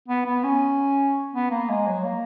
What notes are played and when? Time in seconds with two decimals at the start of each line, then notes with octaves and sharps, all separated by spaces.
0.08 B3
0.26 B3
0.44 C#4
1.33 B3
1.51 A#3
1.70 G#3
1.87 F#3
2.05 A#3